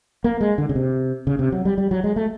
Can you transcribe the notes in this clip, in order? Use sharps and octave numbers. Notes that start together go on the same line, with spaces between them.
A#3
G#3
D3
C#3
C3
C#3
C3
F#3
G3
G3
F#3
G#3
A3